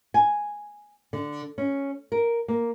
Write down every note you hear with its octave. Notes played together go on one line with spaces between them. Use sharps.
G#5
D3
C#4
A#4
A#3